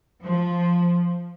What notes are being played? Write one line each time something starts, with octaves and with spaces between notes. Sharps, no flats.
F3